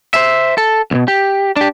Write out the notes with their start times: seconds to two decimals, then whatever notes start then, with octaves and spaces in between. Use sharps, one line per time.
0.14 C5 E5
0.58 A4
0.91 C2 B2
1.08 G4
1.56 D4 G4